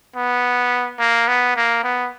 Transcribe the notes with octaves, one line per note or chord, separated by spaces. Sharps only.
B3
A#3
B3
A#3
B3